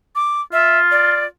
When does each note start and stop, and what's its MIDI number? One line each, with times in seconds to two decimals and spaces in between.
0.16 0.41 86
0.53 1.22 65
0.53 0.79 76
0.91 1.26 74